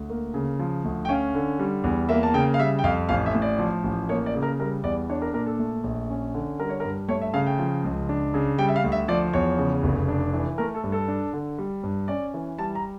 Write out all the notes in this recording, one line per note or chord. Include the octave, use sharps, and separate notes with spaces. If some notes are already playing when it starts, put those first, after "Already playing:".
Already playing: D2
A#3
C#3
F3
D2
G5
C#4 F5
D3
G3
E2
A#3 E5
A5
C#3 G5
F5
G3 E5
G5
F2 F5
A1 F5
E5
A2
D5
F3
A1
A#3 C#5
D5
C#3
A#4
G3 A#4
E2 D5
D4 C#5
A#4
A#2 A#4
A4
A3
A#1
C#4
D3
G3 A#4
C#5
A#4
G2
A3 C#5
E5
C#3 F5
G5
F3
C#2
D4
C#3
G3 G5
E5
F5
D2
E5
F3 D5
E2 C#5
C#3
F1
D4
E3
A3 A#4
A4
G2
A4
D4
D3
G3
G2
C#4 D5
E3
G3 A5
A#5